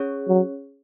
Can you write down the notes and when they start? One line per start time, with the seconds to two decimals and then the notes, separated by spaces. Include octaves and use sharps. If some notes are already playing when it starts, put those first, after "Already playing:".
Already playing: C#4 G#4 C#5
0.28 F#3